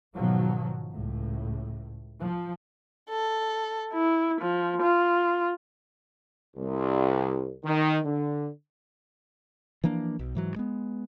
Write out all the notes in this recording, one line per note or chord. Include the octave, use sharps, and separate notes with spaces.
G#2 B2 D#3 F3 F#3
C#2 A2
F3
A4
E4
F3
F4
C2
D#3
D3
E3 F3 A#3 D4
B1
G#2 E3 F#3
G#3 B3